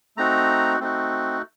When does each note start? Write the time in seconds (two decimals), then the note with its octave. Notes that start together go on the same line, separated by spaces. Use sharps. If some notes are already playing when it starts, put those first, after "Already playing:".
0.17 A3 C4 D#4 F#4 A#5
0.80 A3 C4 D#4 F#4